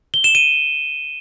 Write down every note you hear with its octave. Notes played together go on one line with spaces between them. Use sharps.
G7
E7
D#7